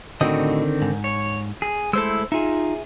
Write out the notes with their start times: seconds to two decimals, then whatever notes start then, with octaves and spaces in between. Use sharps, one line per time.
0.21 A2 D3 D#3 C4 F#4 D#5
0.82 G#2
1.04 C#5
1.62 G#4
1.93 G#3 A3 E4 A4 C5 E6
2.32 D#4 F4 G#4 E5